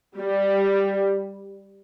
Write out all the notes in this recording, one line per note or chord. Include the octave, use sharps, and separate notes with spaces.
G3